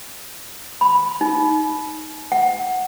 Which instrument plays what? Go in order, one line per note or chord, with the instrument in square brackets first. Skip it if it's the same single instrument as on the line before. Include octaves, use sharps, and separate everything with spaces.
[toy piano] B5
D#4
F#5